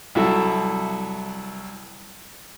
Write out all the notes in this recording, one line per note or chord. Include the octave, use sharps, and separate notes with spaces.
C2 F#3 E4 A4